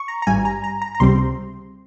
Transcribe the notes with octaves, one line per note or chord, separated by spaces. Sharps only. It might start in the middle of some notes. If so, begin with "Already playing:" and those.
Already playing: C#6
A#5
A#5
G#1 G2 G3 G#5
A#5
A#5
A#5
A#5
C#2 C3 G3 C4 C6